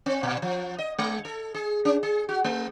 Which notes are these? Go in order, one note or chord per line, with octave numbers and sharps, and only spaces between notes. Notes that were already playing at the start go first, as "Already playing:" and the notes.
C4
A#2
F3
D#5
G#3
A4
G#4
C#4
G#4
F#4
A3